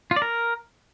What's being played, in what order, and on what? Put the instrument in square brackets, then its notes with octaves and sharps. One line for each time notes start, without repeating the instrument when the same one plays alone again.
[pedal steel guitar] F4
D5
A#4